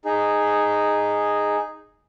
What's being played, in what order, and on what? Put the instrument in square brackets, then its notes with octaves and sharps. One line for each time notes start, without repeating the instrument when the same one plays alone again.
[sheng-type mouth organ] D#4 G#4